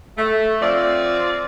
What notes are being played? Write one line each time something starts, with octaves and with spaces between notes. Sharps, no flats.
A3
F3 C4 D5